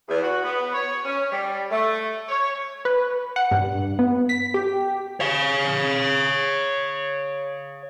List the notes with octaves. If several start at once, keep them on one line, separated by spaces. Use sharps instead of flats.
E2
F#4
B3
C#5
C#4
G3
A3
C#5
B4
F#5
G2
B3
B6
G4
C#5 F5